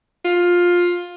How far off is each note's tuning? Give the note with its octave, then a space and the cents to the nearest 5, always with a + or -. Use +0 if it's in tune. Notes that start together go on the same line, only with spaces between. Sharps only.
F4 +15